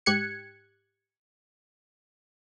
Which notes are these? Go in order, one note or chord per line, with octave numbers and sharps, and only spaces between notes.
G#2 G4 F#6 G#6 C#7